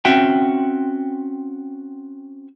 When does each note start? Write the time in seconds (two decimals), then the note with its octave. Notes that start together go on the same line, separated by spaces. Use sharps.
0.05 C4 C#4 F#4 E5 F#5 G5